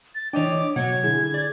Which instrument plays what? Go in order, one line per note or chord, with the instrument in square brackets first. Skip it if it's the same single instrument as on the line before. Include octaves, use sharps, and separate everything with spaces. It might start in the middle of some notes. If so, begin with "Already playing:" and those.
[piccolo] A6
[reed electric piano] E3 D4 [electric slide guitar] C#5 D#5 G5 [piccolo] D6
[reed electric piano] B2 [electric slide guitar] F#3 C#5 F#5 [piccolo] G#6
[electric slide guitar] D3 E4 [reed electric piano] G#4
[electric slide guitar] D5